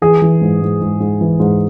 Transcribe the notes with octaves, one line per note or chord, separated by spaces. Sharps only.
E3 G#4
E3
G#2
G#2
G#2
G#2
E3
G#2